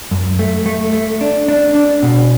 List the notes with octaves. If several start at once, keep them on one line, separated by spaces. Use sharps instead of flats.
F#2
A3
A3
A3
D4
D4
D4
B2